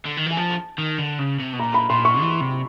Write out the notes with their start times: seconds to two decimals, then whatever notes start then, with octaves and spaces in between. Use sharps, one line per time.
0.05 D3
0.17 D#3
0.26 E3 G#5
0.37 F3 A5
0.78 D#3
0.98 D3
1.19 C#3
1.39 C3
1.53 B2
1.59 A#2 A#5
1.74 B5
1.90 A#2 C6
2.05 C#6
2.21 E3
2.41 C3